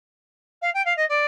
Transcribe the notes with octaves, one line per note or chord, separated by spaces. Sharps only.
F5
G5
F5
D#5
D5